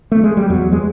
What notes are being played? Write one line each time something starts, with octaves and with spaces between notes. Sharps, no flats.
A3
G#3
G3
E2 F#3
G#3